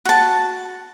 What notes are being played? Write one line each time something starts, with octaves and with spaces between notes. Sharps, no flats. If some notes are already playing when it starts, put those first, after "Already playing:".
F#4 A5